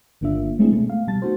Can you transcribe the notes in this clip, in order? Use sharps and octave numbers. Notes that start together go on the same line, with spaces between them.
G1 D3 A#3 D4 F4 E5
G#3 A3 C4 D4 E4 G#4
B2 A3
F5
B2 G3 A5 A6
A3 B3 D#4 F#4 A4 C5